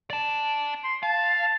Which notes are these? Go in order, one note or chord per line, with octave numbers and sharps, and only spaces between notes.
D5 A5
C6
F5 A5
A5